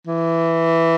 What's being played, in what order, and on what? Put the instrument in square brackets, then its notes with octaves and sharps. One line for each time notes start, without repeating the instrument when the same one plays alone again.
[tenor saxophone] E3